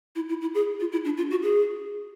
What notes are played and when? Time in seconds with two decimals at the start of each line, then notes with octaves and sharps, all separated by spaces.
0.15 E4
0.29 E4
0.41 E4
0.54 G#4
0.80 F4
0.92 E4
1.05 D4
1.17 F4
1.31 F#4
1.43 G#4